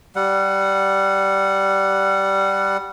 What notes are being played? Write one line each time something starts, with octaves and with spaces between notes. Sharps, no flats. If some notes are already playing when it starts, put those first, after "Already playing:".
G3 F#5